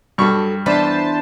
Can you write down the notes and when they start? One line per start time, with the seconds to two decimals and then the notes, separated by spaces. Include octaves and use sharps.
0.18 G2 F#3 F#4 A4 C#6
0.66 E2 E3 D4 B4 C5 A5